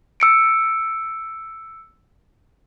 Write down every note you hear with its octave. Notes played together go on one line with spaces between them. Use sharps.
E6 C#7 D7